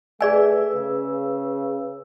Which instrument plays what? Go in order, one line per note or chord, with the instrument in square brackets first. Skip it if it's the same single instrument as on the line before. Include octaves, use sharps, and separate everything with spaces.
[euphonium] A3 [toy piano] G#4 D5 G#5 [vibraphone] B4 E6
[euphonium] C#3